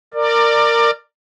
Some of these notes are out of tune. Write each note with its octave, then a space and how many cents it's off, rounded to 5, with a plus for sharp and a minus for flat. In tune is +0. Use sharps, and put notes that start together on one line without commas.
A#4 -15 D5 +15